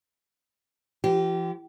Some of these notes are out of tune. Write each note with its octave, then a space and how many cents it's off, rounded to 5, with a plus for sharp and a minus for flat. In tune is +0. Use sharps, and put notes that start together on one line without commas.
F3 -45 G4 -25